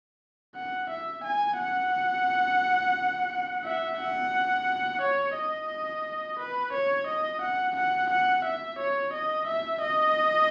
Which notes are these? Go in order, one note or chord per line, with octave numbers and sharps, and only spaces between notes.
F#5
E5
G#5
F#5
E5
F#5
C#5
D#5
B4
C#5
D#5
F#5
F#5
F#5
E5
C#5
D#5
E5
D#5